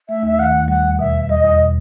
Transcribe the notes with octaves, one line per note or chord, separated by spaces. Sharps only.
A3 E5
D#2 E5
D#3 F#5
D#2
G3 F#5
E2
B2 E5
E2
G3 D#5
E2 D#5
B2